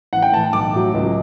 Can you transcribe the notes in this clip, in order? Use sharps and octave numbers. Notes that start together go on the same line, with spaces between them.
A1 F#5
G5
A2 E3 A5
B1 D6
A2 F#3
C#2